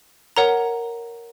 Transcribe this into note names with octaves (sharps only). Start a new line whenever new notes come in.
A#4 C#5 F#5 A#5